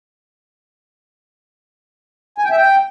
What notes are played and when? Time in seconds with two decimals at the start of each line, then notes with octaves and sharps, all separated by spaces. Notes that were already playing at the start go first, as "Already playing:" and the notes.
2.38 G#5
2.45 G5
2.51 E5
2.57 G5